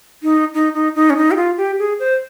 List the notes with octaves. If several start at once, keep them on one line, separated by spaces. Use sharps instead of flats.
D#4
D#4
D#4
D#4
C#4
D#4
G4
F4
G4
G#4
C5